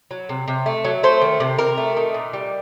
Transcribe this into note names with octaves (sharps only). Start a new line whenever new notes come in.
F#3
C3
C3
A3
F#3
A3 C5
D#3
C3
C3 A#4
A3
D#3
A#2
G3